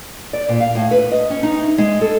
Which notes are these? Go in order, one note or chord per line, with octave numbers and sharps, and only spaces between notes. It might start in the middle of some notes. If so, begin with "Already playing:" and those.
D5
A#2
F5
A2
B4
D#5
C#4
D#4
E4
G#3
A4